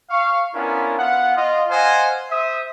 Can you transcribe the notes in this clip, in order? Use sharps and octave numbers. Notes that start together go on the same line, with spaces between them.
F5 C#6
B3 C#4 D4 E4 F4 A#4
B3 F4 F5 F#5
F4 D#5
C5 D#5 F5 F#5 G#5
C5 E5 D#6